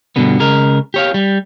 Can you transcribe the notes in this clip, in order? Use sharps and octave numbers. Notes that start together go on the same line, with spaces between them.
G2 B2 D3 B3
C#3 G#3 A#4
G4 C#5 F5
G3